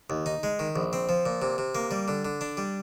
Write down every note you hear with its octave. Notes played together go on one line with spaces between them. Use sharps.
D#2
D#4
G#3
D#3
A#1
C4
F3
A#2
C3
C3
A#3
G3
D3
D3
D4
G3